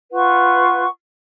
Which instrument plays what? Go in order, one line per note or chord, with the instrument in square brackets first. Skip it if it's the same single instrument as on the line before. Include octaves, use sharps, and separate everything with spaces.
[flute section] F4 B4 F#5 C#6